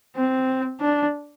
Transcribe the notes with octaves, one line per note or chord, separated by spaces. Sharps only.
C4
D4